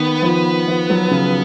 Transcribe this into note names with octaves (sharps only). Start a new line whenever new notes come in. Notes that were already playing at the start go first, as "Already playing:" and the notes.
Already playing: D#3 B3
F3
F3
F#3
C#3